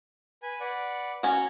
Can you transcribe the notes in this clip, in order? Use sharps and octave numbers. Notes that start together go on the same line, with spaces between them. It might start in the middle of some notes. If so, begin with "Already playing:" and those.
B4 G#5
B4 D5 F#5
C#4 F#4 A#5